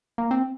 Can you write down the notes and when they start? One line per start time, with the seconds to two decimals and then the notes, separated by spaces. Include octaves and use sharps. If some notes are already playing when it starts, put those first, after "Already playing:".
0.18 A#3
0.31 C4